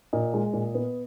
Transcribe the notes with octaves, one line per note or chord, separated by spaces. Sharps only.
A#2 D#5
G#3
A#2
B3